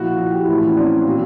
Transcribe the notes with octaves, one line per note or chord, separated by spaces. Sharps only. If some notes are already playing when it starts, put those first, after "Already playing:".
Already playing: A#2 F3 E4 F#4
F#4
G4
E4 F#4
A2 E3
C#4
C4 D4
A#2 F#3